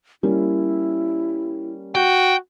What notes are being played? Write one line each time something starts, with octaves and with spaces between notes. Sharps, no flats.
G3 A#3 C#4 E4
F#4 G5